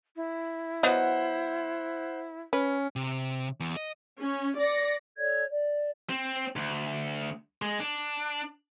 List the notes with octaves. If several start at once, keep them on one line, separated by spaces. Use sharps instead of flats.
E4
F#3 B3 C5 D#5 F#5
C#4 B4
C3
E2
D#5
C#4
D5 A#6 C#7
A4 C#5 D5 G#6
D5
C4
D2
G#3
D4